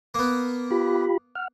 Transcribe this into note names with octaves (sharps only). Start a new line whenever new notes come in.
A#3 B3
F4 G4 B5
F#5 F6